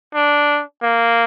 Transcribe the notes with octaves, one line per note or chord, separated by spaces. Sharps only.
D4
A#3